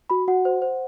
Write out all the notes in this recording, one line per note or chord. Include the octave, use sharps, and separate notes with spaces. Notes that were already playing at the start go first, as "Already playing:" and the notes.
F#4 B5
F#4 F#5
C5
C5